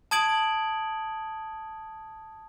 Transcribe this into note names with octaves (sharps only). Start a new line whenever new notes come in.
A5 D#6 G#6 D7 F#7